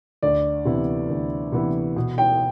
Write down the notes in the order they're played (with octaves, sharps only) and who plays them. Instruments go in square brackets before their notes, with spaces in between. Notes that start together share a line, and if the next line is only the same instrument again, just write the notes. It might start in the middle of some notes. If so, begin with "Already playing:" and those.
[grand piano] D2 [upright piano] D5
[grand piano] C3 E3 B3 E4
D2
C3 E3 B3 E4
B2
[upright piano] G5